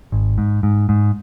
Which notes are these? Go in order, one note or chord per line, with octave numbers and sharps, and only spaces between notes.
G#1
G#2
G#2
G#2